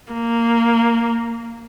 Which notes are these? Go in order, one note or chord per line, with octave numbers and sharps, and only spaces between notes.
A#3